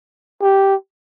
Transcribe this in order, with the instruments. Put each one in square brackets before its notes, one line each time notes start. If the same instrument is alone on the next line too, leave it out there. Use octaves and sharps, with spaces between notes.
[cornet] G4